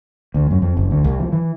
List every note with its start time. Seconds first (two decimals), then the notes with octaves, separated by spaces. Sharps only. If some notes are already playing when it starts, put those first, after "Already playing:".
0.34 D2
0.51 F#2
0.62 F2
0.77 F#1
0.91 D2
1.04 C2
1.19 F3
1.32 E3